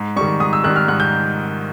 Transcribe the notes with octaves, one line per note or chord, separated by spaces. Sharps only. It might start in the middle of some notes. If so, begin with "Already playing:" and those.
Already playing: G#2
D#3 G3 C#6
G#2 D#6
E6
D#3 G3 F#6
F6
G#2 F#6
G6